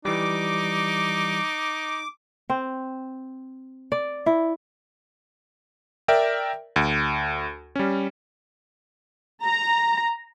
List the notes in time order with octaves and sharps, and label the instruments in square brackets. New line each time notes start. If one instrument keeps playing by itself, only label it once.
[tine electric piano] E3 G3 [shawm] D#4 [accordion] D6
[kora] C4
D5
E4
[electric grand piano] A#4 D5 E5 G5
D2
G3 C#4
[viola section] A#5